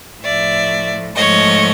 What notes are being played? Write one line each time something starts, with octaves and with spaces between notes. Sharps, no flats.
A2 F3 A3 D5 E5
G#2 F3 A3 C#5 D#5